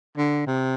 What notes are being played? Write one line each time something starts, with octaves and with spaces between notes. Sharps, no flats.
D3
C3